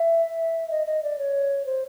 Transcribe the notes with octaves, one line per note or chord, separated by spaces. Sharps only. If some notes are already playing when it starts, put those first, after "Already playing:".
Already playing: E5
D#5
D#5
D5
C#5
C5